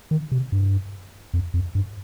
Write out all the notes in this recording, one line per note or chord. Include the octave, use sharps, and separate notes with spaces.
D#3
C3
G2
F2
F2
G2